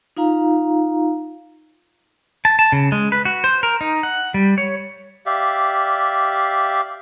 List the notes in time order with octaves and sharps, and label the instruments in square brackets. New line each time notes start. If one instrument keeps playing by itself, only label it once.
[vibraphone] D#4 F4 F5 A#5
[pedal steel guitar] A5
A5
C#3
G#3
B4
F#4
C5
A#4
D#4
F#5
G3
C#5
[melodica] G4 D5 E5 F5